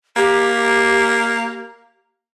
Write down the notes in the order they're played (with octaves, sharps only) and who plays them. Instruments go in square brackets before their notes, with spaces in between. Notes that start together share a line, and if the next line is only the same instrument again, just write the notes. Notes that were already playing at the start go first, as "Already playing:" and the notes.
[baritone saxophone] A#3 [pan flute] G4